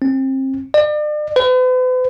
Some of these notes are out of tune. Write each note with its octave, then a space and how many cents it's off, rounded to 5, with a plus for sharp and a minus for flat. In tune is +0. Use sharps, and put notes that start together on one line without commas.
C4 +30
D5 +40
B4 +45